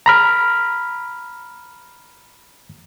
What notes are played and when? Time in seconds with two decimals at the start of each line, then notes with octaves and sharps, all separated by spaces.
0.06 A#5 B5 F6